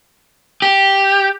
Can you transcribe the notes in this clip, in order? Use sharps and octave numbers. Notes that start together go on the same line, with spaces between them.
G4